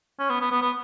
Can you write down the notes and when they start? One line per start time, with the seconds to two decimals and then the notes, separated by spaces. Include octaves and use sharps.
0.19 C#4
0.30 B3
0.41 B3
0.51 B3
0.62 B3